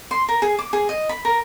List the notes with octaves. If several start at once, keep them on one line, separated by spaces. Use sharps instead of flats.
C6
A#4
G#4
D6
G#4
D#5
B5
A#4